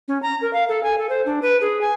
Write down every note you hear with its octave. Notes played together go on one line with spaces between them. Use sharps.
C#4
A#5
A#4
F5
A4
G#5
A4
C5
D4
B4
G#4
G#5